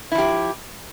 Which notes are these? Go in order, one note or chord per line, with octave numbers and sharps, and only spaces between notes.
F3 E4 G4